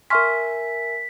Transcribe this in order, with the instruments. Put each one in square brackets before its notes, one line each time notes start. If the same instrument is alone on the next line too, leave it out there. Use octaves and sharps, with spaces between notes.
[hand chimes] A#4 E5 G#5 [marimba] C6 C#6 F6 [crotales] B6